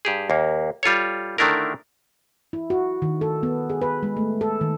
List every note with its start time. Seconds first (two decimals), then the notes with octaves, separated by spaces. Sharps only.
0.05 G2 G4 G#4
0.30 D#2 A#3
0.83 G3 F4 A4 C#5
1.38 D3 D#3 A3 D4 E4 A#4
2.53 E4
2.70 F#4
3.02 D#3
3.21 A4
3.43 B3
3.69 G#4
3.82 B4
4.03 G#3
4.17 A3
4.41 A4
4.61 D#3